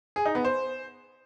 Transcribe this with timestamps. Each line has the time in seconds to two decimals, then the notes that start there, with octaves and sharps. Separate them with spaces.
0.16 G#4
0.26 D#4
0.35 B3
0.45 C5